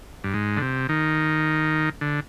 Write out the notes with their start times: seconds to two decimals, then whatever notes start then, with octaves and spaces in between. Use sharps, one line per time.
0.24 G2
0.34 G#2
0.57 D3
0.62 C3
0.89 D#3
2.01 D3